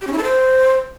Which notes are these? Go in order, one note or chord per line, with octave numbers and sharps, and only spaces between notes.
G4
C#4
E4
A4
C5